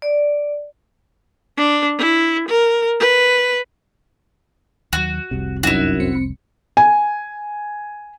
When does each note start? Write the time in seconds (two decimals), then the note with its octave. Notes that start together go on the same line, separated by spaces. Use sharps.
0.02 D5
1.57 D4
1.98 E4
2.48 A#4
3.00 B4
4.93 D#2 F#3 F#4
5.31 F1 C2 C3
5.63 F#2 D#4 E4 F#4
6.00 C4 C#7
6.77 G#5